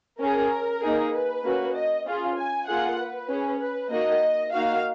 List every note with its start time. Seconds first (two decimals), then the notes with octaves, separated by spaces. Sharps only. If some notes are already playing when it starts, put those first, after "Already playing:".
0.20 C#4 G#4 A#4
0.82 A#3 D#4 G#4
1.13 B4
1.44 A#3 C#4 F#4
1.75 D#5
2.05 C#4 F4 G#4
2.36 G#5
2.67 A#3 F4 G#4 F#5
2.98 B4
3.29 C#4 G#4
3.60 B4
3.90 A#3 D#4 F#4 D#5
4.52 A#3 D#4 F#4 F5